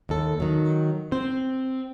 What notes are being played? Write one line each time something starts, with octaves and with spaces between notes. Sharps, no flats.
D#2 A4
D#3 F#3
C4 C5